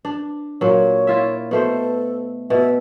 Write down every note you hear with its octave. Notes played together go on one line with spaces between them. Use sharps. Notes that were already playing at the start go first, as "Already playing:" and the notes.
D4
A#2 F#3 C#5
E4 F4 E5
B2 A3 A4 C5
B2 E5